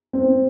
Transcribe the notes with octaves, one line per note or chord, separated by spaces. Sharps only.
C4